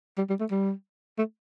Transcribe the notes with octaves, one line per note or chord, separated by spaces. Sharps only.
G3
G3
A3
G3
A3